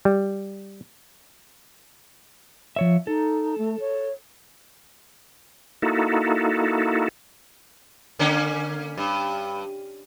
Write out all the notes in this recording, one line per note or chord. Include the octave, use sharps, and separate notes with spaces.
G3
F3 C#5 E5
D#4 A4
A3
C#5
A#3 D#4 E4 F#4 A4
D3 A#3 C#4
G2